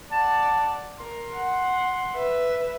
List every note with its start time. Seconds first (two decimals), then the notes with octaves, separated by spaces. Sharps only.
0.12 D5 F#5 A5
0.99 A#4 C6
1.35 F#5
2.15 B4 E5